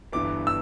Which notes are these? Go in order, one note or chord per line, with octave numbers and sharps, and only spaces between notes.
G1 G2 E3 B3 D6
E6